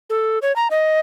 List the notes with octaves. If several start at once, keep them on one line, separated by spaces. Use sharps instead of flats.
A4
C#5
A#5
D#5